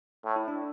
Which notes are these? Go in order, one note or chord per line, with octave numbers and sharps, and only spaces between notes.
A2
E4
D4